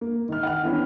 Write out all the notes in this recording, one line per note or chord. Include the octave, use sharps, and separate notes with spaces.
A#3
D#3 F6
F#5 G5 F6
E3 B3 C#4 D4